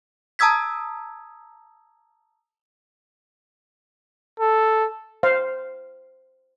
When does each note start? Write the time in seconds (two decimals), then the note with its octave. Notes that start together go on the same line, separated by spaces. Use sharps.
0.39 A5 A#5 D#6 E6 G#6 B6
4.40 A4
5.23 C5 F5